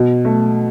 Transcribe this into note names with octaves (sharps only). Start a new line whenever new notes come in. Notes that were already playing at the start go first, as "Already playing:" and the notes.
Already playing: B2
A3